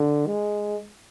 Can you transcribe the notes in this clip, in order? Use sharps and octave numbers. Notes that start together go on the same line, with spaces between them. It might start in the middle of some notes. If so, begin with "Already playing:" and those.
Already playing: D3
G#3